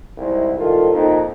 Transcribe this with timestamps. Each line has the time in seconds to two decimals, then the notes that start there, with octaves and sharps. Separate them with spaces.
0.17 C2 G#2 G#3 E4
0.58 C2 D#3 F4 A4
0.93 F2 A#2 D#4